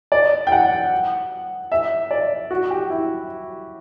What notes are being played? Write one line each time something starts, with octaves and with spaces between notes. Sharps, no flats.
D5
G5
F#5
E5
D5
F#4
G4
E4